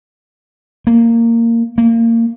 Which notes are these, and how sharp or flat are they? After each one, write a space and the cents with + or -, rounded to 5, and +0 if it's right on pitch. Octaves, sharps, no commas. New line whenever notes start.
A#3 -15
A#3 -25